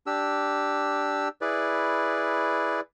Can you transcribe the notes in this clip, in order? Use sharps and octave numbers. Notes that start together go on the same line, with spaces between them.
D4 G4 E6
E4 G#4 B4 D5